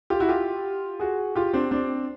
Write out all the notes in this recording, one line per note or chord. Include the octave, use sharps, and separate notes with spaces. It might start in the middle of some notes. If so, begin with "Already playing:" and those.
F4 G4
E4 F#4
F4 G4
F#4 G#4
F4 G4
C4 D4
C4 D4